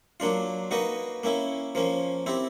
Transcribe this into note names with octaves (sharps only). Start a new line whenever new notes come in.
F#3 A#3 D4 F4
A#3 D#4 F#4 B4 D#5
A#3 C#4 E4
F3 A#3 C#4
C4 E4 G4